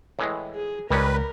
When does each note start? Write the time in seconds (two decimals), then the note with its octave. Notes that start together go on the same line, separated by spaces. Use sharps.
0.19 A2 E3 G#3
0.55 G#4
0.90 C#2 D#3 G3 C#4 A#4 B4